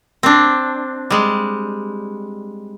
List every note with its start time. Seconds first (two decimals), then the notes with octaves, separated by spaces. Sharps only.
0.23 C4 D4
1.11 G3 G#3